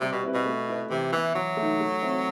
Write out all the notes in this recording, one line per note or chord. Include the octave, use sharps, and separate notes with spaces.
C3 G3
B2
C4 E4 B4
B2
A3
E4 B4
C3 E3
E3 B3 E4
E3 F#3
A3
D#4
A3
C4 E4